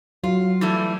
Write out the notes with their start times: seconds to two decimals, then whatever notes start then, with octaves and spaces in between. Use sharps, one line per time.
0.24 F#3 F4
0.61 E3 G3 A3